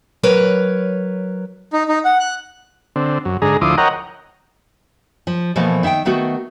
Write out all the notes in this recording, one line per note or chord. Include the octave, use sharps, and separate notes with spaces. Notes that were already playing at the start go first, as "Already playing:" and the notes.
F#3 A#4 B4 C#5
D#4
D#4
F#5
F#6
D3 C4
F#2
G#2 D3 G#4 A#5
D2 F3 E4 C6 D6 D#6
A#4 C#5 D#5 F#5 G5 A#5
F3
B2 E3 F3 A3 A#3
D#3 E5 F#5 G5
D#3 A3 B3 F#4